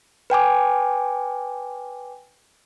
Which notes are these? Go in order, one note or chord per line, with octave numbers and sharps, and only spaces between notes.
B4 G5 G#5 D6